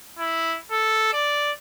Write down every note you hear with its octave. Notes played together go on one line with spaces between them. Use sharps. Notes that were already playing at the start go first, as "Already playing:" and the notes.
E4
A4
D5